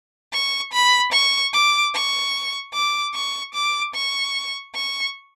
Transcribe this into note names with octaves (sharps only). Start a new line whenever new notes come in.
C#6
B5
C#6
D6
C#6
D6
C#6
D6
C#6
C#6